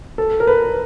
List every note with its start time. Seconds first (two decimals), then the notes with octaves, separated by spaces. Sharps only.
0.18 A4
0.40 A#4
0.47 B4